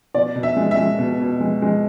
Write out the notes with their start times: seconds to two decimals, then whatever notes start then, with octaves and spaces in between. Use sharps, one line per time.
0.14 B2 D5
0.36 B2
0.43 E5
0.57 G#3
0.71 E5
0.77 G#3
0.99 B2
1.20 B2
1.40 G#3
1.62 G#3